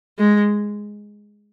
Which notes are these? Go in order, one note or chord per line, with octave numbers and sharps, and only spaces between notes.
G#3